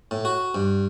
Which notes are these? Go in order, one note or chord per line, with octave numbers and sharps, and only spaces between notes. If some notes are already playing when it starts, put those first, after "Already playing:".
A2
F#4
G2